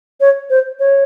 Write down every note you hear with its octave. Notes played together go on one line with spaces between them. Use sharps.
C#5
C5
C#5